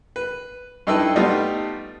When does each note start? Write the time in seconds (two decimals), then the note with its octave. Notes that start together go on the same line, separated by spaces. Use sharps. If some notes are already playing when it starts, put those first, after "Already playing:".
0.16 B4
0.87 G2 D#4 E4 A4 B4 G5
1.16 G3 A3 B3 D#4 F4